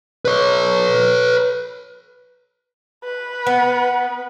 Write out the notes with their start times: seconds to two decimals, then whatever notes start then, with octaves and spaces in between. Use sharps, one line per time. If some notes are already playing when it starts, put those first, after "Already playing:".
0.25 B4 C#5
3.04 B4
3.47 B3